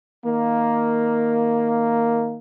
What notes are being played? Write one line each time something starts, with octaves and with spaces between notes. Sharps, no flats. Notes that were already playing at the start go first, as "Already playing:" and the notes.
D#3 A#3